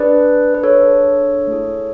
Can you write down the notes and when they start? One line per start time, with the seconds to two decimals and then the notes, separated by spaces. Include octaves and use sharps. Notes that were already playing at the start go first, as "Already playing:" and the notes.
Already playing: D4 G#4 B4 D5
0.54 B4
0.64 A4 C#5
1.47 A3 E4 G#4